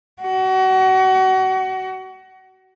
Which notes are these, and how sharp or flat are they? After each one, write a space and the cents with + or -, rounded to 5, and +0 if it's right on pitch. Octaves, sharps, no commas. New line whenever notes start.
F#4 +30